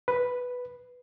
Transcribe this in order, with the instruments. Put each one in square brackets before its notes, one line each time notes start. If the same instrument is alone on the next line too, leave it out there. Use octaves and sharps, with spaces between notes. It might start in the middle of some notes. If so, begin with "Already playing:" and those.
[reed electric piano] B4